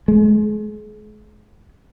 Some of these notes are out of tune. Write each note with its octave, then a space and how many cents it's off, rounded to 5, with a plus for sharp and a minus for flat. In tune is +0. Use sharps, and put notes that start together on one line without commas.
G#3 +35